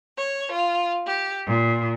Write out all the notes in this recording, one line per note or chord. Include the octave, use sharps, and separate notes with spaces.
C#5
F4
G4
A#2